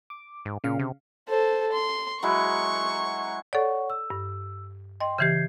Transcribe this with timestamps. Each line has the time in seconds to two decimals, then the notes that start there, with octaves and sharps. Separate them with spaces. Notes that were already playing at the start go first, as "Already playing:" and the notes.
0.10 D6
0.45 G#2
0.64 A#2 C#3 F5
0.79 C3
1.29 A4 C5
1.73 C6
2.23 F#3 G#3 E4 C#6
3.53 A4 C#5 D5 F#5 C#6
3.90 E6
4.10 G2
5.00 D#5 G5 C6
5.18 C#3 E3 G4 G6 G#6 C7